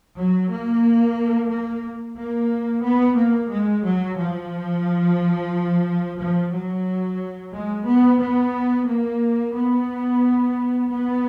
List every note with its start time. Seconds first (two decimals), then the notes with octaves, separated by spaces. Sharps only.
0.16 F#3
0.50 A#3
1.50 A#3
2.17 A#3
2.84 B3
3.17 A#3
3.50 G#3
3.85 F#3
4.18 F3
6.19 F3
6.53 F#3
7.54 G#3
7.87 B3
8.21 B3
8.88 A#3
9.55 B3
10.90 B3